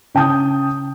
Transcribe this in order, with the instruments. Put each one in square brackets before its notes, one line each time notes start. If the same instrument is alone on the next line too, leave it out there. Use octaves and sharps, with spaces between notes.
[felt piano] C#3 G5 A5 D#6 G6